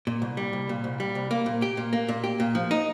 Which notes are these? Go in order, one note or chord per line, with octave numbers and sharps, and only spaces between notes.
A#2
C2
G3
C2
A#2
C2
G3
C2
A#3
A#2
G4
A#2
A#3
A#2
G4
A#2
F3
D#4